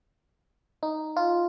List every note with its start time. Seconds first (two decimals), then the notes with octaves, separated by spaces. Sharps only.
0.83 D#4
1.17 F4